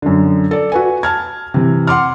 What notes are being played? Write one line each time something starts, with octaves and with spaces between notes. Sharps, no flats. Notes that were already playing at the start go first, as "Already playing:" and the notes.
F#2 D3
A4 D5
F#4 B4 G#5
A5 F6 G#6
C3 E3
F#5 C6 D6 F6